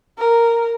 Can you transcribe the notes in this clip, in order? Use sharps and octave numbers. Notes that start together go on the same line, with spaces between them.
A#4